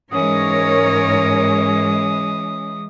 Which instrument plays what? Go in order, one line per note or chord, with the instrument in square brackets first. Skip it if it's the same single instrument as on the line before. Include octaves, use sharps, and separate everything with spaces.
[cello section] G#2 A#4 C#5 [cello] E3 G#3 [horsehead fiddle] C#4 [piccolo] D#6